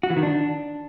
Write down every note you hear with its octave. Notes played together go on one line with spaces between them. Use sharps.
F#4
E3
D#3
D4